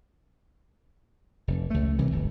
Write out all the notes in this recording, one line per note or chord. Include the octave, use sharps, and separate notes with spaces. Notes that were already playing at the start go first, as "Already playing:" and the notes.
F1
C#2 A3
C2 C3 E3
D1 G1